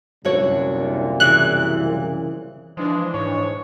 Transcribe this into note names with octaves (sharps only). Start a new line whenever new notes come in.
C2 F#2 A#2 D3 F#4 C#5
C#3 E3 F#6
E3 F3 G#3 D4
G#2 C#5